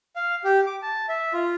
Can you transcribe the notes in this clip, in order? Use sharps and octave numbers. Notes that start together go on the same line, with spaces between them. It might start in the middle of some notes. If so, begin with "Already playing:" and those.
F5
G4
D6
A5
E5
F4